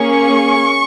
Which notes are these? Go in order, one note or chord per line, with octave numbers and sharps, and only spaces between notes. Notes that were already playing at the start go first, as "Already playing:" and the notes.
Already playing: A#3 C#4 G#4 C#6